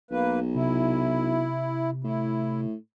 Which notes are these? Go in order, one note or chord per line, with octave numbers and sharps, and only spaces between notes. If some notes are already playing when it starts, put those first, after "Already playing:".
B1 A#3 B4
C3 E4
A2 E4